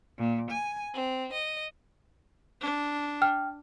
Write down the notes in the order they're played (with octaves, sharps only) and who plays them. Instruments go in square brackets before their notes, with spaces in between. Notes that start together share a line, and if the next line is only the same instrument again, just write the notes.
[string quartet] A#2
G#5
C4
D#5
[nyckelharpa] D4
[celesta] G5 F6